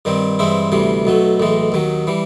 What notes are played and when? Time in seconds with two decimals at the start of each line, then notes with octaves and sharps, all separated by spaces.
0.05 G2 D#3 G3 C4
0.39 G2 E3 G#3 C4 E4
0.72 D2 C3 E3 G3
1.05 B1 B2 F#3 A3
1.40 B1 A2 E3 G#3
1.72 D#2 D#3 F#3
2.07 E3 G3